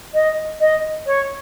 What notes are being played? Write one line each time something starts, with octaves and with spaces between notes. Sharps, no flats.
D#5
D#5
C#5